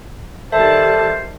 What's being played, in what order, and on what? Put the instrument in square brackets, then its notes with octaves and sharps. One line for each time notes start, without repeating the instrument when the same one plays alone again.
[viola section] D#3 G3 A5 [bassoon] A4 [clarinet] C5 [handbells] E5